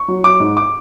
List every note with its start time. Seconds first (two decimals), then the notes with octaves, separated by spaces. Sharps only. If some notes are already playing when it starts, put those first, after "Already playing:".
Already playing: C#6
0.08 F#3
0.24 F#3 D6
0.40 G#2
0.57 D6